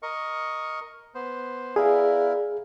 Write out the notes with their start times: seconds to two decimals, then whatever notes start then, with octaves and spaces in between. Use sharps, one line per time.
0.03 A#4 D#5 C#6
1.15 B3 C5
1.76 B3 E4 G#4 A#4 D5 F5